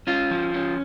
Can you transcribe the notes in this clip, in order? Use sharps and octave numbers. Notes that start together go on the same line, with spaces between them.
C#4 F4
F3
C#4